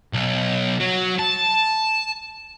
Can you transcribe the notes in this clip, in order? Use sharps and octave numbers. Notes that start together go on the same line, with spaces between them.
B1
F#3
A5